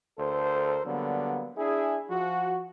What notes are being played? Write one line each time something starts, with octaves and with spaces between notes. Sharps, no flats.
D2 A4 A#4 C5
D3 F#3 G3 A#3 B3
D4 E4 G#4
F3 F#4